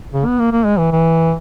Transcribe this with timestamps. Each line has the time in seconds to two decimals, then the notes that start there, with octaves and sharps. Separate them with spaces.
0.13 C#3
0.27 B3
0.39 A#3
0.52 A#3
0.65 G#3
0.78 E3
0.92 E3